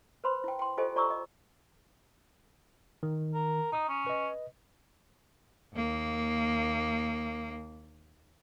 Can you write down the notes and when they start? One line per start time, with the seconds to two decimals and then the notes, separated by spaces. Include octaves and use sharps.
0.24 B4 C5 B5 C6
0.44 E4 G5
0.59 G5 C6
0.77 F4 G4 A4 C5 D#5 G#5
0.96 F4 D5 A#5 C#6 D6 E6
1.10 D#5
3.03 D#3
3.34 A#4
3.72 D#4 A#5 D#6
3.88 C#4
4.07 B4 D#5
5.75 D#2 A#3